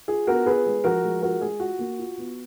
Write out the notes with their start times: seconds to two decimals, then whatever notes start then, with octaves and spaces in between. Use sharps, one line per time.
0.08 F4 G#4
0.27 B3 F#4 A#4
0.46 F4 G#4 B4
0.66 G#3
0.84 F3 F#4 A#4
1.03 G#3
1.22 F4 F#4 A#4
1.41 G#3 G#4
1.60 F4 F#4
1.79 A#3
1.99 F4
2.18 B3